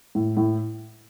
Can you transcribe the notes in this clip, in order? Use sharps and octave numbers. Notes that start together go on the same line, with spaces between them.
A2
A2